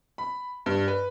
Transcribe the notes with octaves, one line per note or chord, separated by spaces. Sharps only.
B5
G2
B4